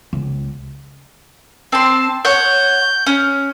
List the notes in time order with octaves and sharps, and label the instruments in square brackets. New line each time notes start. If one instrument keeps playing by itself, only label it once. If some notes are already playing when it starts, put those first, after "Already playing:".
[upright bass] C#2
[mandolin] C4 C6 [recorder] A5
[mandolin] C#5 F#5 [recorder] G6
[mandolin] C#4